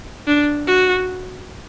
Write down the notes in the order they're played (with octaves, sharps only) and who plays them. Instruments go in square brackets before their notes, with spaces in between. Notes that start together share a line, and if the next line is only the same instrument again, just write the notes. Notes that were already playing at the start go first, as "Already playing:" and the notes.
[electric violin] D4
F#4